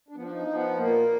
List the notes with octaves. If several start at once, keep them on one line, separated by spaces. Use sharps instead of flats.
D4
F3 B3
D4
D#4
F3
B3
A#2 A#3